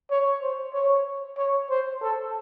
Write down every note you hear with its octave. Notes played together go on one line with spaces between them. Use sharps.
C#5
C5
C#5
C#5
C5
A4